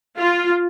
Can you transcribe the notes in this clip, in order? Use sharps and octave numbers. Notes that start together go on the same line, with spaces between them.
F4